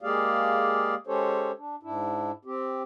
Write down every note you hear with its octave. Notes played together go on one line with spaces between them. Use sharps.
G#3 A#3 G4 G#4 D5 F5
G#3 C#4 G4 A4 C5 C#5
D4
G#2 D4 E4
C4 G4